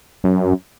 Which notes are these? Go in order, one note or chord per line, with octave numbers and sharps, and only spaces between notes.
F#2